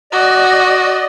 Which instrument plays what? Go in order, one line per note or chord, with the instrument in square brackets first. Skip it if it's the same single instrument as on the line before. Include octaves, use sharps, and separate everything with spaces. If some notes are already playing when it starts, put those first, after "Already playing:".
[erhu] F#4 [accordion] D5 D#5